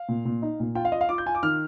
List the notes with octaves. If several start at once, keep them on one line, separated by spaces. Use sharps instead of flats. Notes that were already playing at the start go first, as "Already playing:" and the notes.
Already playing: F5
A#2
A#2
D#4
A#2
F4 G5
F5
F4 D#5
F5
F4 D6
G6
F4 G#5
D6
D#3 F6